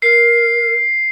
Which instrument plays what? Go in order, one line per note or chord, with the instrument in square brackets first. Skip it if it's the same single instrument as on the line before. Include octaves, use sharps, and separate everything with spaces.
[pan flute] A#4 [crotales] C7